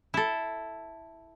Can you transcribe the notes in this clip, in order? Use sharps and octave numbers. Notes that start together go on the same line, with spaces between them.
E4 A4